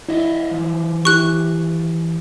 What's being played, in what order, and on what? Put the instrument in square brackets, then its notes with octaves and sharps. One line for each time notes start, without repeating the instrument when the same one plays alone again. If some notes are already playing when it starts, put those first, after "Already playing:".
[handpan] E4 [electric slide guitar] C#5 D#5 E5
[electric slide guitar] E3 F3
[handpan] E4 G4 [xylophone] C#6 F#6